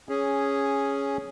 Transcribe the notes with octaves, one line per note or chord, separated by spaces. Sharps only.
C#4 G#4